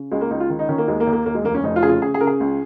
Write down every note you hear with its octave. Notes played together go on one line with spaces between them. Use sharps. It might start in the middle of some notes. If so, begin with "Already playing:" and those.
Already playing: C#3
C#2 G#3
A#3
C#2 D#4
F4
D#3
D#4
D#3 C#4
A#3
D#2 G#3
A#3
D#2
A#3
D#2 A#3
G#3
F1 A#3
C#4
F1 D#4
F4
C#3 G#4
F4
C#3 G#4
G#4
C#3 A#4
G#4
C#2